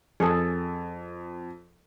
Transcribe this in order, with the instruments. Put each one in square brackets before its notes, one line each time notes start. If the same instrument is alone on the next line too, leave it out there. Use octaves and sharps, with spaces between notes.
[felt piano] F2 [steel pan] G#4 A4